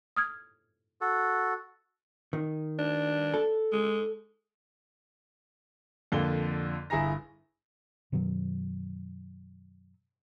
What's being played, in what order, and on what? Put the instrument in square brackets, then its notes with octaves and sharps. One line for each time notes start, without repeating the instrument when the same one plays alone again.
[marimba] D#6 F6 G#6
[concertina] F#4 A4
[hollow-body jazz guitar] D#3
[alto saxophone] D4
[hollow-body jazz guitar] A4
[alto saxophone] G#3
[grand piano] F2 D3 A#3 G7
G1 E4 G#4 G#5 A#5 A#6
[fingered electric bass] F#2 B2 D#3 F#3